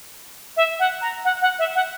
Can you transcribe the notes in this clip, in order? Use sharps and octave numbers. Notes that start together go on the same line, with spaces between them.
E5
F#5
A#5
F#5
F#5
E5
F#5